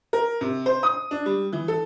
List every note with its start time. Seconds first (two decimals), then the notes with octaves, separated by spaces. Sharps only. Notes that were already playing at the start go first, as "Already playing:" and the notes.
0.13 A#4
0.41 C3
0.66 C5
0.83 D#6
1.11 D4
1.26 G3
1.53 E3
1.68 A4